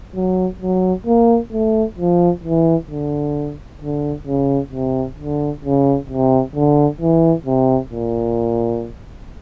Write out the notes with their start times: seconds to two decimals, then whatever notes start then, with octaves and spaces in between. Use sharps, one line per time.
0.15 F#3
0.61 F#3
1.07 A#3
1.52 A3
1.98 F3
2.44 E3
2.90 D3
3.82 D3
4.27 C#3
4.73 C3
5.18 D3
5.65 C#3
6.10 C3
6.55 D3
7.01 E3
7.46 C3
7.93 A#2